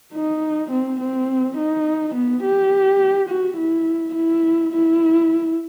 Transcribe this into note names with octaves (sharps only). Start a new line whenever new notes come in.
D#4
C4
C4
D#4
B3
G4
F#4
E4
E4
E4